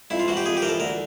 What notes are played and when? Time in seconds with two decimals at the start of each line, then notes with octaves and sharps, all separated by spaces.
0.10 F2 E4
0.20 F4
0.28 E3 F#4
0.37 G4
0.46 F2 G#4
0.57 G4
0.62 E3 A#4
0.68 A4
0.80 D2 A#4